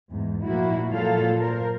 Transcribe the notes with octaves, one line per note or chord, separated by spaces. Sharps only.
E2 G#2
A#2 F3 A#3 E4 F#4
A#2 F#3 F4 A4 F5
A#4 C5